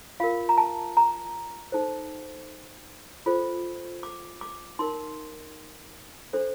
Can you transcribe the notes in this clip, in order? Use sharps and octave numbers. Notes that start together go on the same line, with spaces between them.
F4 A#4 F5
A#5
A5
A#5
D#4 A4 C5
F4 A4 C5
D6
D6
D#4 A#4 C6
D4 A4 C5